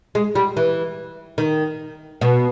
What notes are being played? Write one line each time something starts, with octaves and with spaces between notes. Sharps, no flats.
G#3
G3
E3
D#3
B2